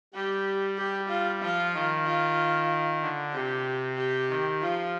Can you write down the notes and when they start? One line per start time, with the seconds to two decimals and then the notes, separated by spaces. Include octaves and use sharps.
0.14 G3 G4
0.78 G4
1.10 F4
1.42 F3 F4
1.74 D#3
2.06 F4
3.02 D3
3.33 C3 G4
3.98 G4
4.30 D#3
4.62 F3 F4